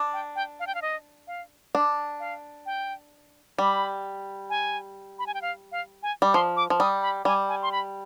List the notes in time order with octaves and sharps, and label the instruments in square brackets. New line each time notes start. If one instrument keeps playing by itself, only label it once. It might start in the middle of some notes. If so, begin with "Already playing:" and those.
Already playing: [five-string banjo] D4
[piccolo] G5
G5
F5
G5
F5
D#5
F5
[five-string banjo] D4
[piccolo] F5
G5
[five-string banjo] G3 [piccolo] B5
[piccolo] G#5
B5
G#5
G5
F5
F5
G#5
[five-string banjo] G3
[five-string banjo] F3 [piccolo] C6
[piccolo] D6
[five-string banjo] F3
[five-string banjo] G3 [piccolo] D#6
[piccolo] B5
[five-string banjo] G3 [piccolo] G#5
[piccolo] G#5
C6
B5